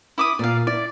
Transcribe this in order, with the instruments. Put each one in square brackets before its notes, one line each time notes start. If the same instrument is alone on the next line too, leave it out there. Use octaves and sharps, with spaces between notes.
[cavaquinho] E4 D6 D#6
[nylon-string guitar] A#2 A#3 [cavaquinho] D5 F5
[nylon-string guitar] E4 [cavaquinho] D5